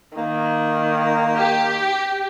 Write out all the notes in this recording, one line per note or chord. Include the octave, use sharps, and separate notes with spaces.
D#3 A#3
G4